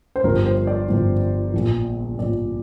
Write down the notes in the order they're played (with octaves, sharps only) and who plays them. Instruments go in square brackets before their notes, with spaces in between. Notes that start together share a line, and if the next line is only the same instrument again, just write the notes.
[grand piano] C5
G1 G2 F3 A#4
C5
D5
G1 G2 F3
A#1 A#2 F3
A#1 A#2 F3 D5